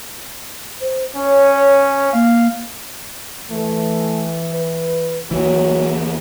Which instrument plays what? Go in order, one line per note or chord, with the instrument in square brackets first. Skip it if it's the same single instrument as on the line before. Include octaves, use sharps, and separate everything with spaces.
[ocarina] C5
[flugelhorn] C#4 [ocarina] C#5
[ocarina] A#3 [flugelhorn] F5
[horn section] E3 [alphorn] A3
[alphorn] B4
[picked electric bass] D#2 E3 [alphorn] F#3